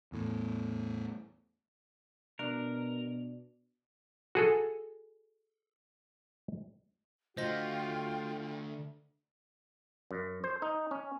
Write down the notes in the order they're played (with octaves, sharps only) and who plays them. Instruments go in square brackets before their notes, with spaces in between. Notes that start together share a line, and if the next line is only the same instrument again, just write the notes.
[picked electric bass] E2 A2
[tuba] B2 [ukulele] D4 [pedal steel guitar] A#4
[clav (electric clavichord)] F#4 G#4 A4
[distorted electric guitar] D3 A3 [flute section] F4 G5 [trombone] F#4 [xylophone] C5 D#5 A#6
[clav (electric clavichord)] F#2
C5
D#4
C#4